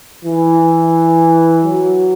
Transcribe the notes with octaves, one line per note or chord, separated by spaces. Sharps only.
E3
F#3